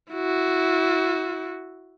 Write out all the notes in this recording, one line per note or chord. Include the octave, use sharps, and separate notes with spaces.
E4 F#4